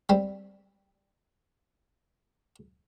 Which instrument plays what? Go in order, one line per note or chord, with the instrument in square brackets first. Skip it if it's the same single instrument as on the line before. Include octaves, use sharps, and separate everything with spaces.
[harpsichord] G3 C4